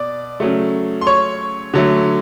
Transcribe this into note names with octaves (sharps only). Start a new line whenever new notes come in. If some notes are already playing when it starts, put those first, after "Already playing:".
Already playing: B2 D5 D6
C#3 F#3 A3
C6
C#5 C#6
D3 F#3 A3